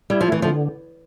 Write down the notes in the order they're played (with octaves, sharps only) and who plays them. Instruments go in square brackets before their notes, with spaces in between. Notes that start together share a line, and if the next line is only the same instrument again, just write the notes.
[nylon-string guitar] G3 [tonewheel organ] E4
[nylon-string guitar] F3
[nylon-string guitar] E3 [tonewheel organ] A3
[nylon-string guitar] F3
[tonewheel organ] D3